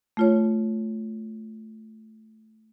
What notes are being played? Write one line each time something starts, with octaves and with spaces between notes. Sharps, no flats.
A3 F4 C#5